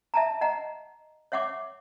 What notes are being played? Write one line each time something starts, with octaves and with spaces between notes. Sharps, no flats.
E5 A5 A#5
D#5 F#5 A#5
C#5 E5 F#5 C#6 D6